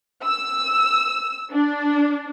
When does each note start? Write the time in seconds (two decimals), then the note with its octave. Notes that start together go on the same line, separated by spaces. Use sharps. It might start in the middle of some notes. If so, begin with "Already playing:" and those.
0.25 E6
1.52 D4